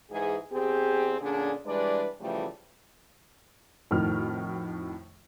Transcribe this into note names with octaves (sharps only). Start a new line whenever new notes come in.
G#2 E3 G#3 G#4
E2 C4 G4 G#4
A#2 D3 C#4 D4 G#4
E3 G3 G#3 D4 B4 D5
C#3 E3 F3 G3 A3
F2 A2 D#3 F#4 F6